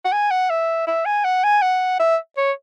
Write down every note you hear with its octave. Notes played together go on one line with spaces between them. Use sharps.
F#5
G#5
F#5
E5
E5
G#5
F#5
G#5
F#5
E5
C#5